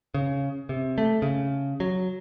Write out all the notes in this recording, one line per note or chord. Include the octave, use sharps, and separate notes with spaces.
C#3
C3
A3
C#3
F#3